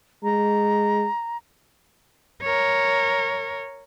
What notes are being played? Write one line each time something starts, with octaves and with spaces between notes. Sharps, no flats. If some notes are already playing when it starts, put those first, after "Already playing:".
G#3 A#5
A#4 C#5